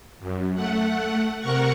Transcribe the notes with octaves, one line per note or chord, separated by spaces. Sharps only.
F#2
A3 F#5
C3 A#4 F#5 C#6